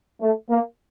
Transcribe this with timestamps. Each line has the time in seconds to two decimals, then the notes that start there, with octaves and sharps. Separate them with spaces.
0.21 A3
0.50 A#3